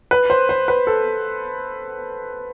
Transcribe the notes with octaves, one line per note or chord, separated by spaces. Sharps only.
B4
C5
C5
B4
A4